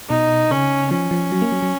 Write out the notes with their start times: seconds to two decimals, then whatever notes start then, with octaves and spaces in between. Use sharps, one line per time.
0.09 B2 D#4
0.50 C#3 C#4
0.91 F3 C#4
1.11 F3
1.32 F#3
1.42 A#3
1.52 F#3
1.62 F#3